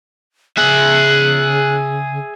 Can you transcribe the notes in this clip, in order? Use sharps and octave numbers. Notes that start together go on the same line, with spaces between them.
C#3 G#4 E5 F#6